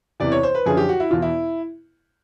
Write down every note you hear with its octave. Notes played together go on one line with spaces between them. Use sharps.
E2 C3 E3 D5
C#5
C5
B4
F#2 D3 F3 G#4
G4
F#4
E4
E2 B2 F4
E4